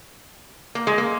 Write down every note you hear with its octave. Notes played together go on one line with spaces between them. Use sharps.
A#3
G#3
A#3